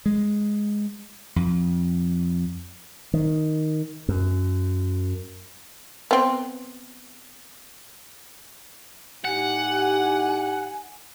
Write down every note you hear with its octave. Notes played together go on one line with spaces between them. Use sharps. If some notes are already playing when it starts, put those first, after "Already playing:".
G#3
F2
D#3
F#2
B3 C4
A2 D#4 G4 F#5 G#5